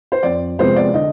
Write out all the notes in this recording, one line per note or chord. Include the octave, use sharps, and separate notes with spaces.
C5
F2 D5
C3 F3 G#3 B3 C5
D5
D3 D#5